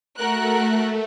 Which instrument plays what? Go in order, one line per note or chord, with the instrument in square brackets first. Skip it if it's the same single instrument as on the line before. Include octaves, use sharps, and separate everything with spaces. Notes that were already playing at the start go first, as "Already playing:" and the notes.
[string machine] A3 [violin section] F#4 A#4 F#6